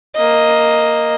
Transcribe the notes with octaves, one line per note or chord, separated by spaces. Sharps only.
A#3 D#5